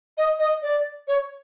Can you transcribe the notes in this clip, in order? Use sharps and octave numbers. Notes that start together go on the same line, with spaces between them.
D#5
D#5
D5
C#5